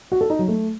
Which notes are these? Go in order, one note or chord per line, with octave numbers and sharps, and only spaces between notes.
F#4
A4
D#4
F#3
A3